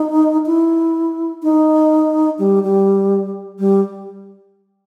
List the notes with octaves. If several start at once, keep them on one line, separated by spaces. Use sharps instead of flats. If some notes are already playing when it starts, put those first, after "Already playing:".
Already playing: D#4
E4
D#4
G3
G3
G3